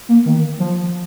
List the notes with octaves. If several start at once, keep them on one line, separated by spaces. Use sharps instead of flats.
A#3
D#3
F3